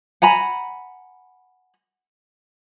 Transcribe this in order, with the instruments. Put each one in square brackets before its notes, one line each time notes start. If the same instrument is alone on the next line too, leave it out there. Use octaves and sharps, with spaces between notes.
[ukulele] F#5 G#5 A#5 B5